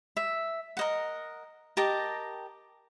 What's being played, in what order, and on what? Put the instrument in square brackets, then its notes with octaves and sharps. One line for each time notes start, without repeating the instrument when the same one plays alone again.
[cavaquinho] E5
A#4 D#5 F#5
G4 A#4 D#5 A5